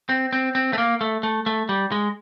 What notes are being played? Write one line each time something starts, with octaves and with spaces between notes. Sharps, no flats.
C4
C4
C4
A3
A#3
A3
A3
A3
G3
G#3